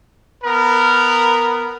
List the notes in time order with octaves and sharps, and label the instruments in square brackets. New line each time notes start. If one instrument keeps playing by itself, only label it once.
[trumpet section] B3 A#4